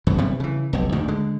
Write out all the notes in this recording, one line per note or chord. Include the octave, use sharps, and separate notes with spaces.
E1 F#2 E3
C3 G3 B3
C#3 E3
F1 B1
D2 G#2 D#3
D3 G#3